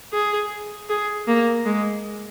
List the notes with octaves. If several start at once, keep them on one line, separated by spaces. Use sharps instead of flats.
G#4
G#4
A#3
G#3